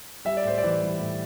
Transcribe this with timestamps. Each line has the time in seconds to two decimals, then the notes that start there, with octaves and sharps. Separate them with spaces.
0.25 G3 E5
0.37 D5
0.44 A2 C5
0.58 D5
0.63 E3
0.82 G3
1.00 A2